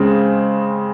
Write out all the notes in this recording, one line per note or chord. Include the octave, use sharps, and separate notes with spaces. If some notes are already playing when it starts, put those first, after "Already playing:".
Already playing: C#3 G#3 C4